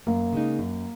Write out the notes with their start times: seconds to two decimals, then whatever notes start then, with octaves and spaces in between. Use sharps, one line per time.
0.07 F#2 A#3
0.33 C#3 G#3 D#4
0.59 F#2